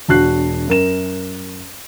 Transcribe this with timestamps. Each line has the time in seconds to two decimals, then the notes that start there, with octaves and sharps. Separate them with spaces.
0.08 E1 D4 F#4 F#6 C7
0.68 F#2 A#4 E7